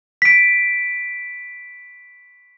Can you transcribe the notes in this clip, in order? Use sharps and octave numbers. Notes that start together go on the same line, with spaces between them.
B6 D7